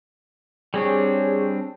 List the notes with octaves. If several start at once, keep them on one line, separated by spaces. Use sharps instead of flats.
G3 C4 D4 G#4 C#5